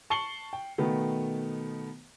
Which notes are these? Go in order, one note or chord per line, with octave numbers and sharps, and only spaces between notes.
A5 C#6 C7 C#7 F#7 G7
G5
B2 D#3 A3 B3